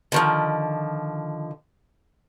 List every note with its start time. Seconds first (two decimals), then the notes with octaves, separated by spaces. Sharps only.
0.12 D3 D#3 F3